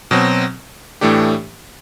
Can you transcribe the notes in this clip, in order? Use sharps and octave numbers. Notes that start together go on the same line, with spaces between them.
B2 F#3 C4
A2 E3 A3 D4 G4